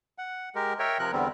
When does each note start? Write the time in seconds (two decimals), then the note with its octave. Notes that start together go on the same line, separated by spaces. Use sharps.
0.18 F#5
0.55 G#3 G4 A#4
0.79 A#4 C#5 E5 G5
0.99 C3 F3 A#4 F#6
1.12 E2 D3 G3 B3 C4